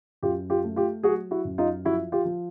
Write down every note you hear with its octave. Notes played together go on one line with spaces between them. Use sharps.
F#2 F4 G4
F4 G4
A3
F4 G4
F#3 F#4 G#4
E4 F#4
F#2
D#4 F4
F3 E4 F#4
F4 G4
F3